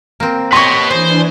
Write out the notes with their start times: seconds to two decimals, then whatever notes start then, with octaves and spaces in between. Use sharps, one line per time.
0.20 A#3 C4
0.53 G4 B4 C#5 D#5 C6 C#6
0.91 E3 D4 G#4 C5 G#5